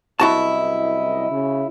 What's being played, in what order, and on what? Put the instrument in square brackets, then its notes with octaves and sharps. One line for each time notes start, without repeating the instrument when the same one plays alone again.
[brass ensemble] C2 F#2 D#5 [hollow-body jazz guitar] E4 F#4 A5
[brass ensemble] C#3